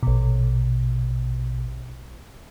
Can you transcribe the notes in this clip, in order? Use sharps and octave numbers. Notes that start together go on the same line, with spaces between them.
A#1 B2